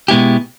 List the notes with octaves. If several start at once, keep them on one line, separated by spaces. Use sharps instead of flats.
B2 G#3 B3 E4 G4